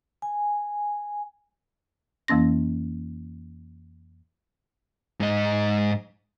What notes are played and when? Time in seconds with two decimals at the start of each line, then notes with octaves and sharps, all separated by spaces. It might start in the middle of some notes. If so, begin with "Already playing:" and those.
0.22 G#5
2.28 F2 E3 A#3 C#4 A#6
5.20 G#2 D#5